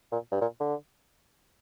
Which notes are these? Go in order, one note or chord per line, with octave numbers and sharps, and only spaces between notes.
A#2
G2
A#2
D3